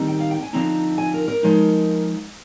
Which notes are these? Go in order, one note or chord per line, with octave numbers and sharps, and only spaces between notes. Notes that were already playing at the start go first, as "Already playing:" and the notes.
Already playing: D#3 G3 C4 D#4
G5
F5
G5
G#5
D3 F3 C4 D#4 A#5
G#5
A#4
A#4
F3 G#3 D#4